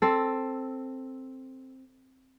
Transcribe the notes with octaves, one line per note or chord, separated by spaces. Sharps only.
C4 A4